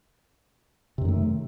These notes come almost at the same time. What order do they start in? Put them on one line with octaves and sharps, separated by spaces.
C3 F#2 D#3 A3